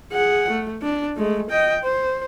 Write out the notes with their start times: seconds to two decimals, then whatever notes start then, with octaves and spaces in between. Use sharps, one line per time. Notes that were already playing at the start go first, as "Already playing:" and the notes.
0.12 G#4 F#5
0.51 A3
0.82 D4
1.17 G#3 A3
1.50 D#5 G5
1.84 C5